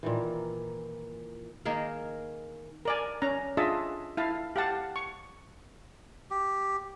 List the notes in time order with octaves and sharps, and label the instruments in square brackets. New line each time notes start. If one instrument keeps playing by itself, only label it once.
[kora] A#2 D#3 E3
D#3 A#3 G#4 A#4
[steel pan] A#4 D5 G#5
C#4 A#5
D4 F4 G#4 D#5 E5 A5
E4 F5 A5
G4 F5 F#5 A5
C#6
[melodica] G4